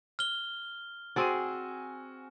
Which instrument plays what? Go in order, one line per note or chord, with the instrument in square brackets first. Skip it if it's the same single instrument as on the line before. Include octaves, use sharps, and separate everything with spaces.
[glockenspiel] F6 G7
[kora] C4 G#4 D5 [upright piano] F#4 G#5 D#7